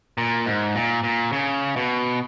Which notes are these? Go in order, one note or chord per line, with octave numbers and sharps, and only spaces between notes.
A#2
G#2
A#2
A#2
C#3
B2